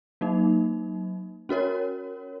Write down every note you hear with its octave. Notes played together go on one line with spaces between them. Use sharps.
F#3 A#3 D#4
C#4 F#4 A#4 C#5